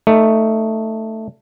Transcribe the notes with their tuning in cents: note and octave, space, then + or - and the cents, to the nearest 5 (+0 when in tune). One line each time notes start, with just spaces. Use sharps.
A3 +10 D#4 +0